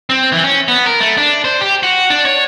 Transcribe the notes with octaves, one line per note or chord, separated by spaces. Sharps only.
C4
E3
C#4
B3
A#4
A3
D4
C5
G4
F#4
D4
C#5